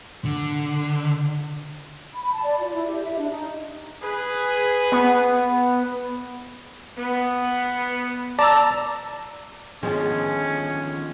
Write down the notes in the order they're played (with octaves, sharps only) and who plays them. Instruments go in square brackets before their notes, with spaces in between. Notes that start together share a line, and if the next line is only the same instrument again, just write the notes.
[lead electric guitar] D3
[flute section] B5
A5
D5
F4
E4
G4
E5
D4
D#4
[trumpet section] G#4 B4
[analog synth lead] B3
[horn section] B3
[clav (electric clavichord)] D5 [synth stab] A5 A#5 E6
[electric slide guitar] D3 D#3 B3 [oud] F3 [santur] G#3 G#4 [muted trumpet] C#4